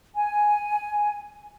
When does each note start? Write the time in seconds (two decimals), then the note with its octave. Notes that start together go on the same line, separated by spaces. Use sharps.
0.15 G#5